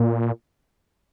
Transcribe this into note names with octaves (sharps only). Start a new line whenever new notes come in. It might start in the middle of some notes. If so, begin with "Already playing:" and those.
Already playing: A#2